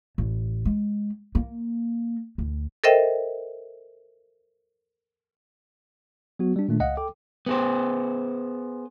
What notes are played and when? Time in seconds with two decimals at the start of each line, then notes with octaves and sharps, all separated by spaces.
0.18 A1
0.65 G#3
1.35 A#3
2.38 D2
2.84 A4 A#4 C5 D#5 E5 G5
6.39 F#3 B3 F#4
6.56 G3 D4
6.68 A#2 D#3 A3 D4
6.80 C#2 D#5 F5 F#5
6.97 A4 G5 D6
7.46 B3 G#4 C5